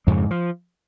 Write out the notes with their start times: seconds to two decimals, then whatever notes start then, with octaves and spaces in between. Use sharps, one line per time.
0.07 F2 G#2 C#3 G#3
0.31 F3